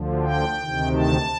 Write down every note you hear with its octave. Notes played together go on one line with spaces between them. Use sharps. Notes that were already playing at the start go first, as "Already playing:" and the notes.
Already playing: D2 D3 F3
G5
D2 C3 D#3
A5